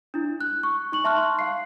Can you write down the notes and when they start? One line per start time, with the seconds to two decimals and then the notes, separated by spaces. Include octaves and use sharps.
0.14 D4 E4
0.41 F#6
0.63 C#6
0.92 D#4 C#6 F#7
1.04 E5 A5 C6 C#6 F6 F#6
1.39 F5 C7